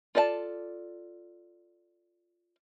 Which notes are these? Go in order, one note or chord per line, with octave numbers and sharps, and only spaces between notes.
F4 A4 D5 E5 A5